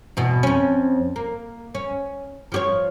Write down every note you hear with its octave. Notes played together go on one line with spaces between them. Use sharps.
E2 B2
F2 C#4
A#3
C#4
F3 G4 C#5